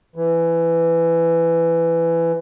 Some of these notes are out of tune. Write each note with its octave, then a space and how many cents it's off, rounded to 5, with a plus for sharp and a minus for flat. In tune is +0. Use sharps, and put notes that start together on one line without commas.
E3 +15